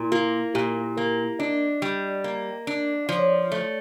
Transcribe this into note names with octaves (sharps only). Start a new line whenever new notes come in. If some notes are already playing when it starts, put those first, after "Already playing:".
Already playing: A#2 E4
A#3 F4
A#2 G4
A#3 A#4
D4 D#5
G3
A#3
D4
F3 D5
C#5
D5
A3